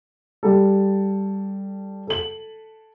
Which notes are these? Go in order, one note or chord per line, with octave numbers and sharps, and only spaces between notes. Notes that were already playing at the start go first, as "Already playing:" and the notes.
G3 A4
A4 F#7